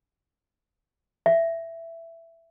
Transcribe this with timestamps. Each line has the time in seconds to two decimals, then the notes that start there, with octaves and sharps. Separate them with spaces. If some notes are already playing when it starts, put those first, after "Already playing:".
1.26 E5